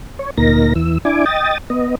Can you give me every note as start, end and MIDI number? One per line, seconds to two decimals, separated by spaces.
0.19 0.30 73
0.38 0.73 38
0.38 0.73 46
0.38 0.73 58
0.38 0.73 63
0.38 0.73 70
0.38 0.73 94
0.75 0.98 40
0.75 0.98 52
0.75 0.98 88
1.05 1.25 62
1.05 1.25 64
1.05 1.25 80
1.05 1.25 86
1.26 1.58 75
1.26 1.58 79
1.26 1.58 87
1.26 1.58 93
1.70 1.95 59
1.70 1.95 75